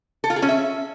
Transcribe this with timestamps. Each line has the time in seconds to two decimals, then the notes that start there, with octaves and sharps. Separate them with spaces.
0.24 A4
0.30 F4
0.36 G#4
0.42 C#4
0.49 E5